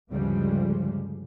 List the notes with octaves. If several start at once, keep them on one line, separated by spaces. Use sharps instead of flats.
D2 G2 C#3 F3 G3 G#3